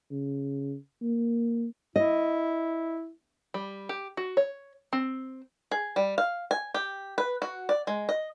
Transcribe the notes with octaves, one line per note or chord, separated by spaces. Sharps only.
C#3
A#3
E4 D#5
G3
G4
F#4
C#5
C4
G#4
G3
F5
G#5
G4
B4
F#4
D5
G#3
D#5